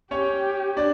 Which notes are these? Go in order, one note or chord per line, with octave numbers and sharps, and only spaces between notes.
C#4 G4 C#5
D4 D5